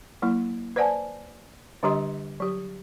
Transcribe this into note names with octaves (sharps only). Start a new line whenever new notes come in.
F#3 A#3 E4
B4 C5 D5 F#5 G#5 A5
D3 G3 D4 G4 D#5 C6
F#3 G4